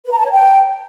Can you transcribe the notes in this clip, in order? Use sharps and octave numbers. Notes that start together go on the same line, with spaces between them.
B4
A#5
A5
C#5
G5